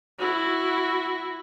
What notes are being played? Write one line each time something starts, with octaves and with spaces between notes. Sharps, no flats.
E4 F#4